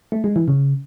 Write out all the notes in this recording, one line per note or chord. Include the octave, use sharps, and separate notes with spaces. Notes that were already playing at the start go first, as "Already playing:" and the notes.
A3
G#3
E3
C#3